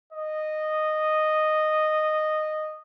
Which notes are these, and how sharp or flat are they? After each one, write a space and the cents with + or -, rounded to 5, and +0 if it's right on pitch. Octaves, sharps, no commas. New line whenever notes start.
D#5 -10